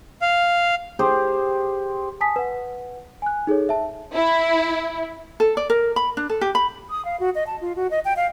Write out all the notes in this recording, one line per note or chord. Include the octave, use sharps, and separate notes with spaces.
F5
G4 G#4 C5
G#5 A5 D#6 B6
B4 F#5
G#5 F#6
D#4 G#4 A4 C#5
E5 A5
E4
A4
D5
A#4
B5
D4
A4
G4
B5
D#6
F5
F#4
D#5
A5
F4
F#4
D#5
G5
F5